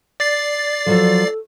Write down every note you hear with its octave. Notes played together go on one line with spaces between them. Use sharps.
D5 A6 C7
F3 F#3 A4